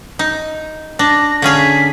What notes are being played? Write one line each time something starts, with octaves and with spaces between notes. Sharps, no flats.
D#4
D4 A#6
D3 C#4 G#4 F5
B6